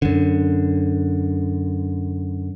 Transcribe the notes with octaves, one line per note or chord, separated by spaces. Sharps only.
F#2 D3